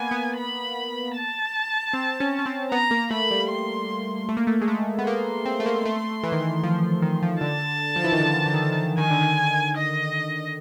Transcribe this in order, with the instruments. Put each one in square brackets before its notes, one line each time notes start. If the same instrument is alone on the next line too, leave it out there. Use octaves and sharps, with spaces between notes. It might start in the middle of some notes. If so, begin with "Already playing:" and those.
Already playing: [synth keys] A#3 B3 [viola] G#5
[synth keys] B3
[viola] B5
A5
[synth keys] C4
C#4
C#4
C4
[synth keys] B3 [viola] A#5
[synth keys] A#3
[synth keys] A3 [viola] B5
[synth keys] G3
[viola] C6
[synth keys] A3
A#3
A3
G#3
A3
B3
[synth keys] A#3 [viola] C6
[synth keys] C4
A3
A#3
A3
E3
D#3
E3
F3
D#3
F3
[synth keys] D3 [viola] A5
[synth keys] F3
E3
D#3
D3
D3
D#3
D3
D#3
[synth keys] D#3 [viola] G#5
[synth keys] D3
D#3
[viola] D#5